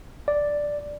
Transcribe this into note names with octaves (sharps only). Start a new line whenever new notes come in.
D5